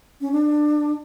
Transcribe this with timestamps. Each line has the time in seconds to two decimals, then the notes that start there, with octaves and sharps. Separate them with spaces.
0.21 C#4
0.32 D4